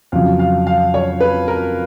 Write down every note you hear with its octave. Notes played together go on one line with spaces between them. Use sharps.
F2 C#3 F#3 F5
F5
F5
C#5
B4
A#4